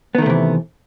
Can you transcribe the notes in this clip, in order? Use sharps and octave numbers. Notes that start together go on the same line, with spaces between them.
C3 D#3 E3 A3 B3